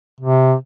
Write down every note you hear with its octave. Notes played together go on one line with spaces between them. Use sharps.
C3